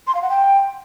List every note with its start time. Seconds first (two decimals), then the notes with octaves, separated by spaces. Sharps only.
0.07 C6
0.15 F5
0.22 F#5
0.30 G5